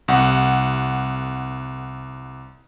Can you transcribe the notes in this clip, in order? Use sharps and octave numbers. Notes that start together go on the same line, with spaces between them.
C2 F#5